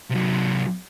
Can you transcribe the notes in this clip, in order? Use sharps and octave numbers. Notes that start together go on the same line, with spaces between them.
C3 F#3